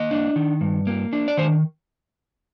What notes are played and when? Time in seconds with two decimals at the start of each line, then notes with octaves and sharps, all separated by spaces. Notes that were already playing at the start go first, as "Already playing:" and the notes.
Already playing: A#3 D#5
0.11 D4
0.36 D#3
0.61 G2
0.87 A#3
1.13 D4
1.28 D5
1.37 D#3 C5